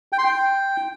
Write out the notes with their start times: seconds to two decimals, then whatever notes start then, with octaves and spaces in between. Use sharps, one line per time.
0.13 G5
0.18 C6
0.24 G5